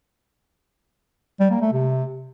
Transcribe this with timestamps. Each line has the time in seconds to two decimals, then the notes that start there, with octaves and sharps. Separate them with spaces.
1.40 G3
1.51 A#3
1.61 A3
1.72 C3